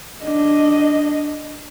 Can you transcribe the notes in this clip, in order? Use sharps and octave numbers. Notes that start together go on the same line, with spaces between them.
D4 D#5